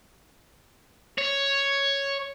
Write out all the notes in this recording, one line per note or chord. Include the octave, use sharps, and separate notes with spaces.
C#5